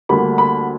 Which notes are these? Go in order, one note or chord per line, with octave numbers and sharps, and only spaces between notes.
D2 D3 G3 A#3 B5
B5